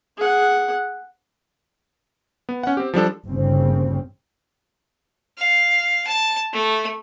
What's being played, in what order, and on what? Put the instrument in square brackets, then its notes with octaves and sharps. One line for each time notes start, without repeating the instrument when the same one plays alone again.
[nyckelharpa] G#4 F#5
[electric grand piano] B3
C#4 F#5
C4 G4
F3 G3 D4 A4
[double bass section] G1 D#2 C#3 C4
[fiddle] F5
A5
A3